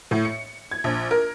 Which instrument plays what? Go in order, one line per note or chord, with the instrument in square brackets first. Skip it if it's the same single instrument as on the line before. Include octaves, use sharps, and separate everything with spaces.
[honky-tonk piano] A2
C#7
G#6
A#1
A#4